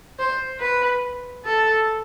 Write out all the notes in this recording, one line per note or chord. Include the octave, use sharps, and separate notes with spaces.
C5
B4
A4